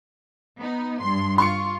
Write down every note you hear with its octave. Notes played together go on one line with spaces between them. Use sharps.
B3 D#4
G2 C6
F4 C6 C#6 C#7